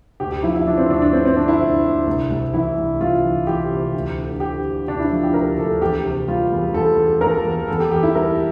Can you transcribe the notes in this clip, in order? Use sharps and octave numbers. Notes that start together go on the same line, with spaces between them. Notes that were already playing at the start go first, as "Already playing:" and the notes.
D2 G4
G4
F3 E4
E4
F3 D4
C4
D2 D4
D4
D3 C4
C4
D3 D4
E4
D2
D2
C2
C2
E3 E4
C2
C2 F4
E3
E3 G4
C3
D2
D3
D3 G4
D3
D2 D4
E4
F3
G4
D2 A#4
D2 A4
E2 G4
C3
G3 F4
E2
E2 A4
E2
E2 A#4
E2
E2 A4
G4
E2 G4
E4
G3 A#4